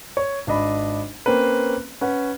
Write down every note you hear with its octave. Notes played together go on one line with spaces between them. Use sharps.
C#5
G#1 D4 D#5 B5
A#3 C4 C#4 B4
C#4 B4 F#5